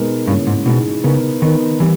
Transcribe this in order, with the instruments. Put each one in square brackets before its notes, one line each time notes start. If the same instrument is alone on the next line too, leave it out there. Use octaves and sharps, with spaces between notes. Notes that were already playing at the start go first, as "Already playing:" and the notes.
Already playing: [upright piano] B2 G#3 B3 D#4 A#4
[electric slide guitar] G2 [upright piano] C#3 E3 A#3
[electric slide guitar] G#2
[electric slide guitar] B2 [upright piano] E3 G#3 D#4
[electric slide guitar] C#3 [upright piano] B3 D#4 A#4
[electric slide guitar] D#3 [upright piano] B3 D#4 A#4
[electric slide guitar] E3 [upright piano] G3